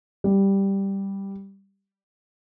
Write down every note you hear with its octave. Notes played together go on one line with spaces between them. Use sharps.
G3